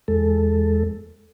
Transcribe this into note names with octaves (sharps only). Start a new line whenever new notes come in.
E2 G#3 A4